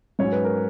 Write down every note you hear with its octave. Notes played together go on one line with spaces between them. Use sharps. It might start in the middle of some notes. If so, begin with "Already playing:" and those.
G#2 F#3 C#4 C#5
B4
A#4